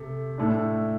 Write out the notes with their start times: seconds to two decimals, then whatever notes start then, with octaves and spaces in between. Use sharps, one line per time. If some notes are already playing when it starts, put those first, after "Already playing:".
Already playing: C3 A3
0.38 A2 A3 D4